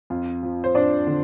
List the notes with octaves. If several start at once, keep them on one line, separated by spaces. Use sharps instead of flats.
F2 F4 F5
F3
C5
C4 D4 D5
D3